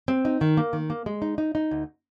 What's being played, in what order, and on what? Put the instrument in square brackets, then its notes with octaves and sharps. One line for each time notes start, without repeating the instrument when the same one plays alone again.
[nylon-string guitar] C4
D#4
D#3
A#3
D#3
A#3
G#3
D#4
D#4
D#4
D2